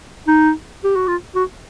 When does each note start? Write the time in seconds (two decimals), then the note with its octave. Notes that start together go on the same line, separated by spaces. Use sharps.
0.27 D#4
0.84 G4
0.96 F#4
1.08 F4
1.35 F#4